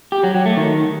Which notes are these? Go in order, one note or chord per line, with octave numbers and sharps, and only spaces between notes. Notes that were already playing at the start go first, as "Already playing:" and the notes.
G4
F#3
F#3
A3
D#3